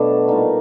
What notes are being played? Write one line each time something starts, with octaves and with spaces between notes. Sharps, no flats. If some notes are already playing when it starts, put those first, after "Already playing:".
Already playing: B2 F#3 A3 D4
A#2 G3 D#4